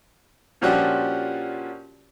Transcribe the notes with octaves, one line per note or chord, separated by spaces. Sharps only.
A#2 F3 C#4 D4 F#4 G4